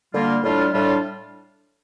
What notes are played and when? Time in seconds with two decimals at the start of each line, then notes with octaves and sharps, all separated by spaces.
0.14 D3 G3 A#3 F4
0.43 A2 G3 D4 F4
0.73 A2 G3 D4 F4